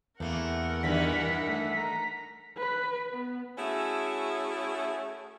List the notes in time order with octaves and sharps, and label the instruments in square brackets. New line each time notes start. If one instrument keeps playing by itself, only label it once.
[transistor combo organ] E2 [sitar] A3 A#3 [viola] A#4 F#5
[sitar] G2 D#3 E3 [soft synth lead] B6
[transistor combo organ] A3
A#5
[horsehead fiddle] B4
B3
[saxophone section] A3 C#4 E4 F#4 G#4